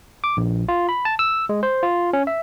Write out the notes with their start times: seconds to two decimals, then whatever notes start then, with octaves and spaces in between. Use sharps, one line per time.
0.24 D6
0.37 A#1
0.69 F4
0.89 B5
1.05 A5
1.19 E6
1.49 G#3
1.63 C5
1.83 F4
2.13 C#4
2.27 E5